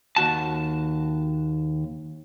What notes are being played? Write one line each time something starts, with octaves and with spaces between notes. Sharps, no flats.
D#2 F#4 A5